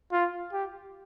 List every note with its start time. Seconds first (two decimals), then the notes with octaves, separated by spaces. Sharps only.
0.13 F4
0.53 G4